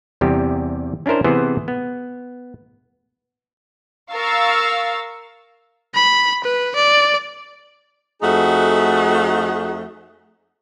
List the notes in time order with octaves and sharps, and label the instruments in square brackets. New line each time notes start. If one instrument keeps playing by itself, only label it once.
[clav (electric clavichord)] E2 C3 G3 G4
C#4 D4 E4 A#4 C5
C3 E3 B3 G#4 C5
B3
[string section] A#4 F5 C#6 E6 A6
[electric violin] B5
B4
D5
[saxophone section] F2 A3 D#4 F#4 G#4 F#5